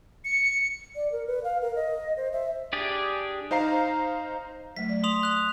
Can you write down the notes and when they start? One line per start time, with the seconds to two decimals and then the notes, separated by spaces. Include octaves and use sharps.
0.24 C#7
0.96 D5
1.12 A#4
1.27 B4
1.44 F5
1.62 A#4
1.75 D#5
2.17 C5
2.33 E5
2.73 D4 G4 G#4 D5
3.51 D#4 C5 F5 A#5 C7
4.76 F#3 A3 B6
4.89 D5
5.04 C6 D#6 F7
5.23 F#6 F7